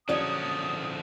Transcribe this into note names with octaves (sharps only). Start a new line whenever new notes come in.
E2 D3 F3 F#3 C#4 D5 D#6